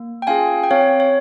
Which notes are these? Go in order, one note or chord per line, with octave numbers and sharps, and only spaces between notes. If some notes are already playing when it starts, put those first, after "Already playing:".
Already playing: A#3
G5
C#4 F4 G#4 F5 G#5
G5
C4 C#5 F5
C#5